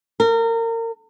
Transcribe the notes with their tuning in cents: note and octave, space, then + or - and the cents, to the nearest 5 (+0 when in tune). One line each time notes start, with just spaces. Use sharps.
A#4 -30